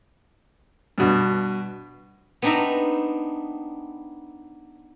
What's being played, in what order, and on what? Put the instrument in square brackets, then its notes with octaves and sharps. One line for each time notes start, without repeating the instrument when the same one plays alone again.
[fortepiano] G2 B2
[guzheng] B3 C4 D4 D#4 E5 A#5